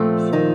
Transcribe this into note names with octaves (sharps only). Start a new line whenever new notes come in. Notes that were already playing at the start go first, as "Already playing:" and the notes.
Already playing: A#2 F3 A3 C4
D#3 D#4